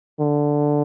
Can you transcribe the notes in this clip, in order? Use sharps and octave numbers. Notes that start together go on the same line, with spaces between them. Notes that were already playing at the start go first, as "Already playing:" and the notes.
D3